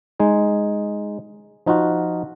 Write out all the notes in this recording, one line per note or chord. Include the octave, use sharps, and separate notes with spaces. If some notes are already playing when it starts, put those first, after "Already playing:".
G#3 D#4 G#4
F3 D#4 F4 F#4